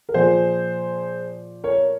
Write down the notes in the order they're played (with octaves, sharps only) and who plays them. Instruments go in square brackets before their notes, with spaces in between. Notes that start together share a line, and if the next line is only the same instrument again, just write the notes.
[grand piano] A#4
A#2 F3 G#4 C5
A#4 C#5